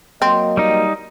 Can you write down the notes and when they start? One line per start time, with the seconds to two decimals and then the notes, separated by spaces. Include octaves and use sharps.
0.22 F#3 A#3 C4 D#5
0.57 G3 D#4